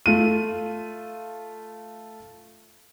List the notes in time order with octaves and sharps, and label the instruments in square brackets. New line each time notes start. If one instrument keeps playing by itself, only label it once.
[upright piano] A3 F4 D#7